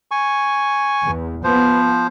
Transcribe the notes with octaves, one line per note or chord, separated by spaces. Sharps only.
G#5 C#6
E2
F3 B3 C5